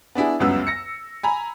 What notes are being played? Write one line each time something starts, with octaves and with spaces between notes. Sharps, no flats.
B3 D4 E4 G#4
G1 C#2 F#2 B3 E6
A#6 C#7
G#5 A#5 B5